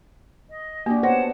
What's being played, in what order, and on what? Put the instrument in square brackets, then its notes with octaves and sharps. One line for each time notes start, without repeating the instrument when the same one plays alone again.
[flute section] D#5
[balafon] A#3 [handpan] D4 F#4 G4
[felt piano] B3 C5 A#6 [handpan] F#4 C#5 [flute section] F#5 A5